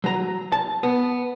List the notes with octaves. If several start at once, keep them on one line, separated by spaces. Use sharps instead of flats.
F#3 A#5
A5
B3